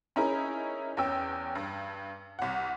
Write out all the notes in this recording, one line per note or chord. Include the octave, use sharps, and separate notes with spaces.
C#4 D#4 E4 G#4 A#4
E2 C#4 G5 E6
G2
C2 F#5